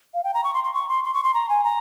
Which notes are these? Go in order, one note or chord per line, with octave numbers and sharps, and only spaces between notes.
F5
G5
A#5
C#6
C6
C6
C#6
C6
C6
C#6
C6
A#5
G#5
A#5